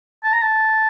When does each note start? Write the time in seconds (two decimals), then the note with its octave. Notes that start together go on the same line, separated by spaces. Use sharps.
0.23 A5
0.33 A#5
0.42 A5